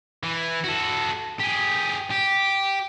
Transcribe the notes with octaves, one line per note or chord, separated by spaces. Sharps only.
E3
F#4 A4
G4 G#4
G4